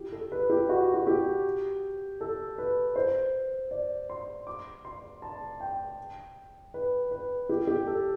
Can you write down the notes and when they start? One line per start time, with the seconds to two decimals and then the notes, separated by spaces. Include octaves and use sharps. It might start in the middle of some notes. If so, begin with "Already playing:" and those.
Already playing: G4
0.12 A4
0.32 B4
0.50 G4
0.69 F#4
0.94 F#4
1.07 G4
2.21 A4
2.58 B4
2.96 C5
3.71 D5
4.10 C6
4.47 D6
4.85 C6
5.22 A5
5.60 G5
6.74 B4
7.11 B4
7.49 G4
7.67 G4
7.87 A4